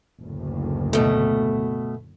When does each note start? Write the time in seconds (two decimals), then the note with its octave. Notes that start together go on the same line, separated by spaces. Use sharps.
0.21 F#1 D2 A2
0.93 B2 A3